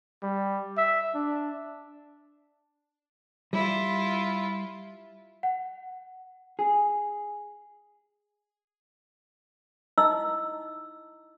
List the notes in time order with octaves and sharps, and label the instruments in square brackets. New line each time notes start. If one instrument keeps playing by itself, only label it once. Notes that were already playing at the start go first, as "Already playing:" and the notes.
[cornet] G3
E5
D4
[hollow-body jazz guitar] G3 [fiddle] E4 F4
[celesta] F#5
[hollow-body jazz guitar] G#4
[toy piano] D#4 E4 D#5 E6